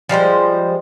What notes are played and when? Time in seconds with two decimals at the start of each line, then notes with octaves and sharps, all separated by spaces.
0.09 F3 G3 G#3 C5